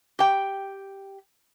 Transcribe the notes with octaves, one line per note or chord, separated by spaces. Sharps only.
G4 G5